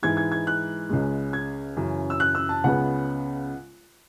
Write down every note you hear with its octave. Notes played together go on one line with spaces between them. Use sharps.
G#2 E3 G#3 G#6
G#6
G#6
F#6
C#2 C#3 G#3
G#6
F#2 C#3 E3
E6
F#6
E6
A5
C#2 C#3 G#3 B3 F#5